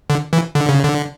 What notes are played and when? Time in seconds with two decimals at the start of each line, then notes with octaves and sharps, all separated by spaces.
0.10 D3
0.33 E3
0.55 D3
0.69 C#3
0.83 D3